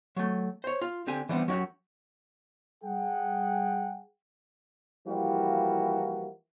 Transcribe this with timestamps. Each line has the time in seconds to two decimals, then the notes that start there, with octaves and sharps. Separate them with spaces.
0.16 F#3 A3
0.64 C5 C#5
0.82 F4
1.07 D3 C4 G4 G#5
1.29 E3 G3 B3 C4 D4
1.48 F#3 C#4 E4 F#4 G4
2.83 G3 G#4 F#5 G5
5.07 E3 F3 G3 A#3 E4 F#4